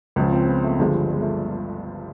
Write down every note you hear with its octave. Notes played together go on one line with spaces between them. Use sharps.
C#2 C#3 F3 C#4
C4
B3
A3
G1 G2 D3 F3 G#3
G#3
A3